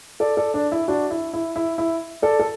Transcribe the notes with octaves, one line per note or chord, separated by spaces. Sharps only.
A4 D5
A4 D5
D4
E4
D4 F#4
E4
E4
E4
E4
A4 D5
A4